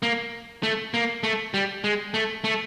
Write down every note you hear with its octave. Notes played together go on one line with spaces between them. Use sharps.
A#3
A3
A#3
A3
G3
G#3
A3
A3